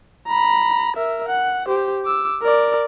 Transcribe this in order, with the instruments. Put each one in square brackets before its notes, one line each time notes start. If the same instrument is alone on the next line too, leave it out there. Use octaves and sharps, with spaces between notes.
[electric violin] A#5 B5
A#4 E5
F#5
G4 C5
D6 E6
A#4 D5